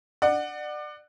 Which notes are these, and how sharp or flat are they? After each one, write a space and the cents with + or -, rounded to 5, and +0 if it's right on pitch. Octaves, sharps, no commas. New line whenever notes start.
D5 +30 F#5 +0